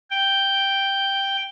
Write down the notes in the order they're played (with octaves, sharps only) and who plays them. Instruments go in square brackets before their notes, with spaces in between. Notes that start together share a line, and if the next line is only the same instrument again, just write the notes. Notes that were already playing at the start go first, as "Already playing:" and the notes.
[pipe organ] G5